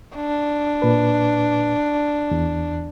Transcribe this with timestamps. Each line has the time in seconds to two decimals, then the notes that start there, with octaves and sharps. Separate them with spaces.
0.15 D4
0.82 A#2 B4
2.31 E2